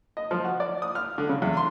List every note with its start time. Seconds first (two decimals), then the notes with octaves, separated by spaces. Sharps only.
0.17 D#5
0.31 F3
0.44 F#4
0.60 D5
0.82 D#6
0.95 F6
1.18 D3
1.29 C#3
1.42 E2
1.57 C6